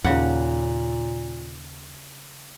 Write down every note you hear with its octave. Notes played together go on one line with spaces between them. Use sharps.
D#2 A#2 C#3 F#5